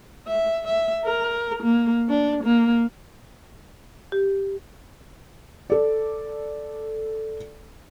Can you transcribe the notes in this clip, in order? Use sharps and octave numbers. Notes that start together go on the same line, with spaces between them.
E5
E5
A#4
A#3
D4
A#3
G4
A4 D5